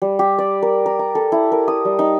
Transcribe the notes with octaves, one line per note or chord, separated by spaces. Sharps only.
G3
G4
D5
A#4
A#4
A#5
A4
E4
A#4
D#6
G3
D#4